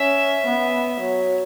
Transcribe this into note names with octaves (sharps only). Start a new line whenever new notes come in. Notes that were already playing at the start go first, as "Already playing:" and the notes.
Already playing: C#4 E5
B3
F#3